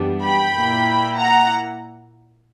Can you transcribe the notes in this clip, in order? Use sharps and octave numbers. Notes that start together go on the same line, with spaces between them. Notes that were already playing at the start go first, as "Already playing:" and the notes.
Already playing: F#2 E3 G3 B3 D4
G5 B5
A#2 A#3 E4
F#5 A#5